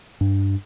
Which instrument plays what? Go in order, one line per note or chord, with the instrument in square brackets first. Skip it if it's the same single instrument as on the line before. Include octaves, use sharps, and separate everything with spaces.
[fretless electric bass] G2